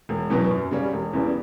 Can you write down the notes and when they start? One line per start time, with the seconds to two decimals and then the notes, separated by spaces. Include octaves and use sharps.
0.09 E1
0.30 E2 B2 F#3 B3
0.51 F#2
0.71 C#3 G3 C#4
0.93 E1
1.13 E2 C#3 E3 G3